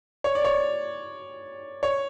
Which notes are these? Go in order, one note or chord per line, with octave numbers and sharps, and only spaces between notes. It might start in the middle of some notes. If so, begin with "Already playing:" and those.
C#5
D5
C#5
C#5